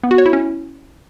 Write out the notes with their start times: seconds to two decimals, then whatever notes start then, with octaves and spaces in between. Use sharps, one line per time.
0.04 B3
0.11 F#4
0.18 C#5
0.26 E4
0.33 C#4